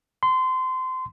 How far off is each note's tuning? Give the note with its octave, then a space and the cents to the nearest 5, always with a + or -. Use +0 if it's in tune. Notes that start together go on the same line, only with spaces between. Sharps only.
C6 -25